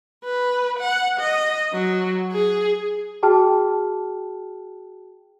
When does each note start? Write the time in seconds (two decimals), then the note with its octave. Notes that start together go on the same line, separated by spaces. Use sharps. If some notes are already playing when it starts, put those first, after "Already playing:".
0.24 B4
0.79 F#5
1.19 D#5
1.73 F#3
2.32 G#4
3.23 F#4 G#4 G5 A5 F6